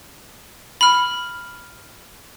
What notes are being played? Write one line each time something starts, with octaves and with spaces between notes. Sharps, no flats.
B5 F6